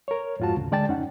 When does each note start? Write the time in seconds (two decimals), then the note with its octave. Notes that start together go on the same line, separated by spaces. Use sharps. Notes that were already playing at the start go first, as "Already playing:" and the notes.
0.08 A#4 C#5
0.40 F2 G#2 F4 F#4 A5
0.57 D2 C#3
0.72 D3 G#3 D5 G5 A5 A6
0.88 F2 C#4 D#4 F#5